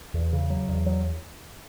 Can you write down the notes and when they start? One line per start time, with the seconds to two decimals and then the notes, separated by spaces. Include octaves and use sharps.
0.14 E2
0.33 C#3
0.50 F#3
0.68 E2
0.86 F#3